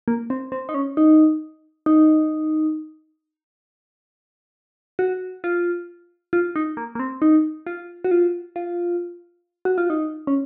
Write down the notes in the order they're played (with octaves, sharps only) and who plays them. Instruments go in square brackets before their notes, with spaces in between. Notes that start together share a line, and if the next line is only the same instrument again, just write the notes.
[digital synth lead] A#3
C4
C4
D#4
C#4
D#4
D#4
F#4
F4
F4
D#4
A#3
A#3
C4
D#4
F4
F#4
F4
F4
F#4
F4
D#4
C#4